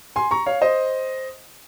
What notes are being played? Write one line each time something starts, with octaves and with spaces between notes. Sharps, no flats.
G#5 C6
A#5 C#6
C#5 F5
C5 D#5